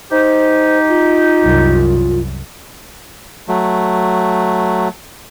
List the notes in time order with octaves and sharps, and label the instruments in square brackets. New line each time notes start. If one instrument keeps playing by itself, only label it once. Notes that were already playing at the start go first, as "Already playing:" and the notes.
[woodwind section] D#4 G4 [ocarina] C5
[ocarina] F4
[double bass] C2 F#2
[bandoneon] F#3 A3